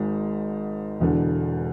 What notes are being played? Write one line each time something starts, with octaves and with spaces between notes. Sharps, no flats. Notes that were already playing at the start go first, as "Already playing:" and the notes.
Already playing: G#1 G#2 G#3
E1 E2 D3